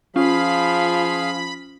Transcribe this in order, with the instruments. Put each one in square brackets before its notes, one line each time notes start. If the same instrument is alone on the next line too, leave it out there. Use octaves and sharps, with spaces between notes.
[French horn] F3 [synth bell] C#4 F4 [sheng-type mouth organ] G#4 F5 [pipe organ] B5